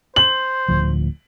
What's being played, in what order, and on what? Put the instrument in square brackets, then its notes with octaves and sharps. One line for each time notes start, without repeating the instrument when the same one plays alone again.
[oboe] C5 [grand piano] F#7
[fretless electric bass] D1 D2 F3